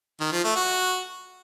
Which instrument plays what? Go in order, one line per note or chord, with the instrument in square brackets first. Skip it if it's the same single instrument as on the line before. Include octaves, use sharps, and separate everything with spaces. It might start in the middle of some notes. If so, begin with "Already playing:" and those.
[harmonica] D#3
F3
A3
F#4